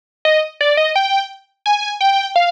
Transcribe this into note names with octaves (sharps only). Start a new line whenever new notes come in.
D#5
D5
D#5
G5
G#5
G5
F5